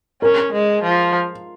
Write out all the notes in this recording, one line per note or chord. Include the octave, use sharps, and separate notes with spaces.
C#4 A#4
G#3
F3